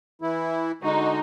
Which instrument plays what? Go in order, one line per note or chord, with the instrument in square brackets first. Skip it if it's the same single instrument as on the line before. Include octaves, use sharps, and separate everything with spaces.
[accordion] E3 E4
[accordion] D3 G#3 F#4 [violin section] D#4